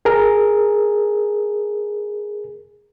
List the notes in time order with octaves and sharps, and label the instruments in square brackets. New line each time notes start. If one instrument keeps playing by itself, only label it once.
[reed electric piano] G#4 A#4